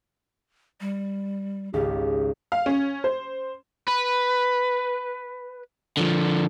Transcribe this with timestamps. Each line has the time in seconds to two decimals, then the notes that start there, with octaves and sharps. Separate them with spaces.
0.81 G3
1.74 G#1 C#2 G#2 G4
2.52 F5
2.66 C#4
3.04 C5
3.88 B4
5.97 D3 F3